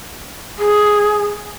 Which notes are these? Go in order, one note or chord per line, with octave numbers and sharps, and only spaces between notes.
G#4